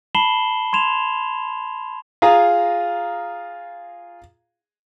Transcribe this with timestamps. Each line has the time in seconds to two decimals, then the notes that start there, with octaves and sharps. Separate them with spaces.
0.15 A5 B5 C7 E7 F#7 G7
0.73 C6 G#6 E7 F7
2.22 F4 G#4 F5 A#5 D#6 F6